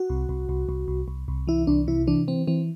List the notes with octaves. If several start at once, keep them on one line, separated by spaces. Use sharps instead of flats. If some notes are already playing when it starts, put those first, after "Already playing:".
Already playing: F#4
C2
C2
C2
C2
C2
C2
C2
E3 E4
C2 D4
C3 E4
E3 D4
E3 C4
E3 C4